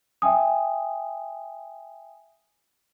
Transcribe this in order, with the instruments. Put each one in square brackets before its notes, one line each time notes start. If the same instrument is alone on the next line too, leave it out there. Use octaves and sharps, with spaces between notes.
[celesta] E5 G5 G#5 D#6